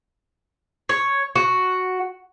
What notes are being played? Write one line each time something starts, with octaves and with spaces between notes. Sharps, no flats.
C#5
F#4